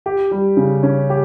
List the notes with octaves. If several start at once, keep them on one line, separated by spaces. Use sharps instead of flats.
G4
G3
C#3
C#4
G4